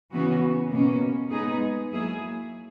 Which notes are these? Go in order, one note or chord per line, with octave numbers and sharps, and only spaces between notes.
C#3 E3 B3 F#4
B2 A#3 C#4
G#3 B3 D#4 G#4
F#3 A#3 E4 G#4